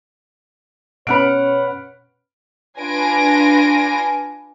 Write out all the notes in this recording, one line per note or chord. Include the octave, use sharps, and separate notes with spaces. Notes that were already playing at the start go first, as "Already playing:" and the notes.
B2 C#4 B4 C#5 F#5 B5 F6 D7
D4 F4 B4 G#5 A#6 D7